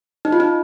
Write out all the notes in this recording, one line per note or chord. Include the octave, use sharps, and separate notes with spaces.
D#4
F4
D#4